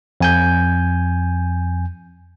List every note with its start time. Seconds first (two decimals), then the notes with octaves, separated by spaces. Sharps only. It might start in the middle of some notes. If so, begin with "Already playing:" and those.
0.20 F2 G#5 G6